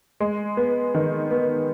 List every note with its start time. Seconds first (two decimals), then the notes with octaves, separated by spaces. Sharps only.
0.20 G#3
0.57 B3
0.94 D#3
1.30 B3